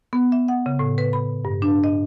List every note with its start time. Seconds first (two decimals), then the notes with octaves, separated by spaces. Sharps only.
0.13 B3
0.32 E5
0.48 F#5
0.66 C#3
0.79 A2
0.98 B4
1.13 B5
1.45 G2
1.62 D4
1.84 D#5